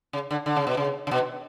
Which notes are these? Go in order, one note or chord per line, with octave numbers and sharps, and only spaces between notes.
C#3
D3
D3
C#3
B2
C#3
C#3
B2